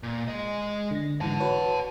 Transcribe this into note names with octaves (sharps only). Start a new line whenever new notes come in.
A#2
G#3 D#5
D3 A#6
G#2 D3 E3 F#5 A5
F#4 B4 C#5